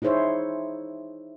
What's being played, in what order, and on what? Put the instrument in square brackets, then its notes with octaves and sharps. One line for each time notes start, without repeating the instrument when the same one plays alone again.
[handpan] D#4 E4 G#4 C5 C#5 E5